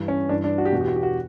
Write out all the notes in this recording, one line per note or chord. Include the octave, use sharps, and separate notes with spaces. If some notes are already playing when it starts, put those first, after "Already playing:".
Already playing: G2 E3
C#4
G2 E3 D4
D4
F#4
G4
E2 B2 F#4 G4
F#4
G4
F#4